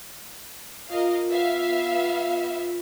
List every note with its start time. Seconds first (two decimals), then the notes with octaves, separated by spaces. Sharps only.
0.90 F4 A#4 D#5 F5
1.29 B3 E5 F5